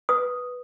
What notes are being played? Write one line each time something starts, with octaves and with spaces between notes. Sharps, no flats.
B4 D#6